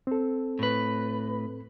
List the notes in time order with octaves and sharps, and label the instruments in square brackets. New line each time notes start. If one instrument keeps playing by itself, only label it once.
[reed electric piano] C4 A4
[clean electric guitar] A2 B4